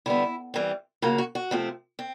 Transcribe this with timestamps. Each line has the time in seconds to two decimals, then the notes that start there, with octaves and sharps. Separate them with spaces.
0.06 D3 G3 B3 E4
0.54 E3 G3 C4
1.02 C#3 F#3 A#3 F4
1.18 F#4
1.35 F#4
1.51 C3 F3 A3 C4
1.99 C4